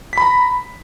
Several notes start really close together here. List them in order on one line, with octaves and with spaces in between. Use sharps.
B6 B5 A#5